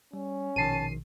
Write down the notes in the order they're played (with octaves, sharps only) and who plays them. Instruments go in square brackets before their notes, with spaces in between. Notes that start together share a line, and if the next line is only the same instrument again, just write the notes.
[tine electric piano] G3 [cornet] C#4
[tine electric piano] A#1 B2 D#3 [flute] A5 [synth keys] C7 D#7